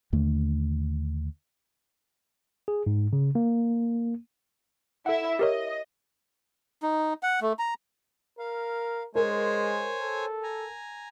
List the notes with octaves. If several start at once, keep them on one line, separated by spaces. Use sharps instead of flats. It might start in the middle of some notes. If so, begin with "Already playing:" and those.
D#2 D3 A3
G#4
G#2
C#3
A#3
E4 A4 E5 F#5
G4 A#4 C#5 D#5
D#4
F#5
A3
A#5
A#4 F5
G#3 A#4 C5 C#5 G#5
A4
G#5 A#5